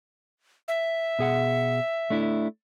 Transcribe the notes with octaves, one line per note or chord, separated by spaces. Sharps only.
E5
B2 G#4 F#5
A3 D4 E4